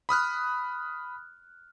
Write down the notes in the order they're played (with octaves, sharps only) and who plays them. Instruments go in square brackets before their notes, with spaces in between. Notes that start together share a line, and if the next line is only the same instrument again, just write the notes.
[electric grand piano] B5 D#6 F6 F#6